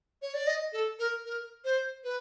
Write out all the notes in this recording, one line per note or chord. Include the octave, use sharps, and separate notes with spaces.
C#5
D5
D#5
A4
A#4
A#4
C5
B4